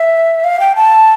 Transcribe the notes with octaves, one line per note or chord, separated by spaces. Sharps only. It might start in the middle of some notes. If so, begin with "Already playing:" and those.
Already playing: E5
F5
G5
A5